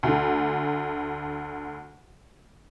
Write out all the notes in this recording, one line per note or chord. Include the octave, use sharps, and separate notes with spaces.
D2 D3